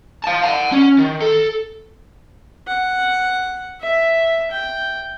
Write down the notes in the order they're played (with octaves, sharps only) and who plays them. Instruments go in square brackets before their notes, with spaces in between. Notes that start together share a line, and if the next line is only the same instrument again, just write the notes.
[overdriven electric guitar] F5 A5
F#5 A5
C#4
D#3
A4
[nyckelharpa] F#5
E5
G5